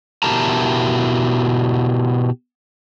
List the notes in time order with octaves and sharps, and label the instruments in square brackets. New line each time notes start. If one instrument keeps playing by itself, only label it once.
[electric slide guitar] B2 E4 G4 A#4 A5 A#5